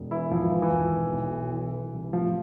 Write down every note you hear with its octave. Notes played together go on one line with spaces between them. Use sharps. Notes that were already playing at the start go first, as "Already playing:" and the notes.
Already playing: E1
E3 E4
G#1 F3
E3
E3
G#1
B1
B1
B1
E3
E3
C2
A1 F3